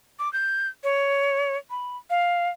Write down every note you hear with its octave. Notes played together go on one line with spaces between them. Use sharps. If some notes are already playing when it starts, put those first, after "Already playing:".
D6
G6
C#5
B5
F5